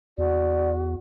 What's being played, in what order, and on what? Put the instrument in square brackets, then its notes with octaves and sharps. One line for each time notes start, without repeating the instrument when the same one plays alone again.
[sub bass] E2 [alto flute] F#4 [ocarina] D5